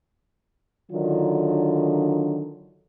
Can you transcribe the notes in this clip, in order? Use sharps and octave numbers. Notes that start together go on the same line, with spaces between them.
D3 D#3 F#3 D4 F4